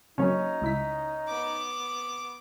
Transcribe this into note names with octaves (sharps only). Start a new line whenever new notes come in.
C#3 F#3 A#3 C#4 D#4 C#5
C#2 E4 B6
B3 D6